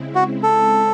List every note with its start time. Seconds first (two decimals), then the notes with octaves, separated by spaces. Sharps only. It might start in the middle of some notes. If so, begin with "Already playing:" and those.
Already playing: C#3 G#3 C4 E4
0.15 F#4
0.43 A4